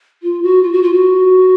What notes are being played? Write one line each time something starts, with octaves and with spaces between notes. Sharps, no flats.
F4
F#4
F4
F#4
F4
F#4